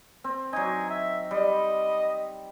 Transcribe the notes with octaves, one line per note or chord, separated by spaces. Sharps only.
C4
F#3 D#4 G#5
E5
G3 D#5